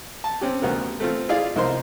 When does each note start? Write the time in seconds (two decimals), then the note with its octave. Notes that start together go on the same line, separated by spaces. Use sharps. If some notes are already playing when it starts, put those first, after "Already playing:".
0.24 A5
0.41 C4 C#4 G4
0.62 D2 G3 B3 A#4
1.00 A3 C4 F4
1.29 E4 F4 G#4 D5 F5
1.56 C2 F3 D#4 A#4 C5 C6